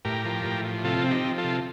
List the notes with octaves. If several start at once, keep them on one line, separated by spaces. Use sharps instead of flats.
A2 G4 A#4
F3
A2
F3
C3 F4 A4
C4
D#4 G4
F3
F4 A4
C3